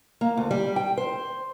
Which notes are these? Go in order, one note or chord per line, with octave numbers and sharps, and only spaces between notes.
A#3
D2
G3
G5
C5